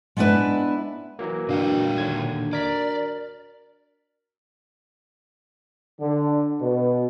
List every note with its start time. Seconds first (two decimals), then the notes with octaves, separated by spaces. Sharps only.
0.17 G#3 B3 D4 E4 B4 E5
1.19 E3 F#3 A#3
1.49 A#2 D4 F#4 F5 G5
1.97 D#2 D3 G#6
2.53 A#4 D5 B6
6.00 D3
6.61 B2